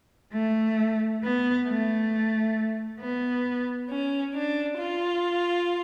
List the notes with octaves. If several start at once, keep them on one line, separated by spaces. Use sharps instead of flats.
A3
B3
A3
B3
C#4
D4
F4